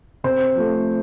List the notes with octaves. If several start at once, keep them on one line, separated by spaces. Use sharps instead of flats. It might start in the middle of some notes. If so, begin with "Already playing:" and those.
C3 C5
F3 A3